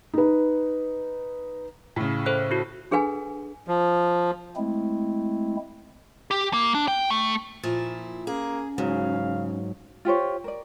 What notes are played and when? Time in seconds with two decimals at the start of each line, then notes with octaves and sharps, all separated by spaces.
0.14 D#4 B4
1.96 A2 C#3
2.26 A4 C5 F#6
2.51 E4 F#4
2.91 D4 G#4 A4 B4 F#5 G#5
3.68 F3
4.56 G#3 A3 C4 E4
6.31 G4
6.53 A#3
6.74 D4
6.88 G5
7.10 A3
7.63 A#2 F3 E4
8.27 A#3 C#4 G#4
8.78 G#2 C#3 F#3 F5
10.05 F4 G4 C5 C#5
10.44 A#4 D5